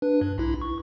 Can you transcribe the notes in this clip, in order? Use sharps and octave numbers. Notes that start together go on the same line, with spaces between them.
D4 B4
G2
B1 E4
C#6